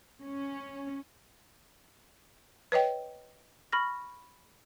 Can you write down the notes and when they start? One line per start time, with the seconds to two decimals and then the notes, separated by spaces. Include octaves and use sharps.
0.23 C#4
2.72 B4 C#5 D#5 G5
3.72 B5 C#6 F6 A#6